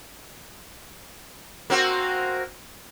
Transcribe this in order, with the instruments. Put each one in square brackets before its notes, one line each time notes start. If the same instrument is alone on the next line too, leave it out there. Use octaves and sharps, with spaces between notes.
[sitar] A#3 C4 F#4